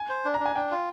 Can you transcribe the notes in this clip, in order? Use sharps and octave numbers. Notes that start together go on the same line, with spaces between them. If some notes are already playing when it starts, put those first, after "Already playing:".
Already playing: G#5
C5
D4
A#5
D4
G#5
D4 G5
F4